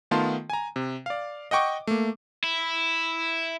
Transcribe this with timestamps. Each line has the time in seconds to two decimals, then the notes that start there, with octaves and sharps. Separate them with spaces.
0.11 D#3 A3 B3 F4 A5 C6
0.50 G#5 A#5
0.76 C3
1.06 D5 F5
1.51 D#5 F#5 G5 C#6 D6
1.87 A3 A#3
2.44 E4